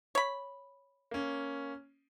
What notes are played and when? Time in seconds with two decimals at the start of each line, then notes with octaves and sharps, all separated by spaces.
0.15 C#5 B5
1.11 A#3 C#4